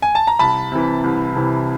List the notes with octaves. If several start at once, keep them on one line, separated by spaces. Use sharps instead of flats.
G#5
A5
A#5
C2 A5 B5
C3 E3
C2
C3 E3